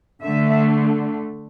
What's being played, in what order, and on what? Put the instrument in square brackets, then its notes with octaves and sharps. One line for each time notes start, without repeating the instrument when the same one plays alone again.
[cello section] D3 A3 E5